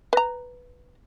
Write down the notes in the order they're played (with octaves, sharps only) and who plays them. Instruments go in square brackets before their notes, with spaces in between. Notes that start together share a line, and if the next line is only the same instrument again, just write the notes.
[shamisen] B4 A#5